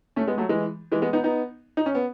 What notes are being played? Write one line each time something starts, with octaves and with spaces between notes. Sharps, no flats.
A3 C#4
G#3 B3
F#3 A3
E3 G#3
E3 G#3
G#3 B3
B3 D#4
B3 D#4
D#4
C#4
B3